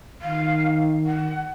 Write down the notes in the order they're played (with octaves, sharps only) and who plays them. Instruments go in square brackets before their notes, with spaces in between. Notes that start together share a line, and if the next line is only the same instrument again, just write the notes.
[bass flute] D#3 [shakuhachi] F5
[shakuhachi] F#5